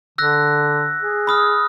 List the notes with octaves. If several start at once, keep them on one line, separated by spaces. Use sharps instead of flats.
D3 E6 F#6 A#6
G#4
B5 D#6 F6